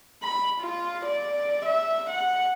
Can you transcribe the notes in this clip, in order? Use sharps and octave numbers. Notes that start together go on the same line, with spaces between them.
B5
F4
D5
E5
F#5